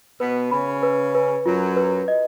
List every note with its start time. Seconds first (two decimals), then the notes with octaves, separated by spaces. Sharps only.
0.20 B2 B3 B4
0.51 C#3 C#4 B5
0.83 B4
1.15 B4
1.45 F#2 F#3 F4
1.76 B4
2.08 D#5